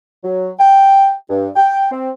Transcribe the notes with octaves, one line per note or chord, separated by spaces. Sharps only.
F#3
G5
G2
G5
C4